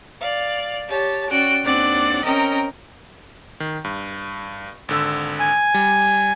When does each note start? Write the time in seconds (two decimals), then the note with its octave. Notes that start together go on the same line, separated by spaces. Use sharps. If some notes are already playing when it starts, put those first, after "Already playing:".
0.21 D5 F5
0.89 G4 C#5 A5
1.30 C#4 F#4 D5 G5
1.65 D#2 C4 D4 D5 F#5 D6
2.25 C4 C#4 A#4 D#5 G5 A#5
3.60 D#3
3.84 G2
4.89 G#1 D3 E6
5.39 G#5
5.74 G3